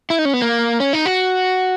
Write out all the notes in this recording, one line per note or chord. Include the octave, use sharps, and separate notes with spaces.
E4
D#4
C#4
B3
A#3
C#4
D#4
F#4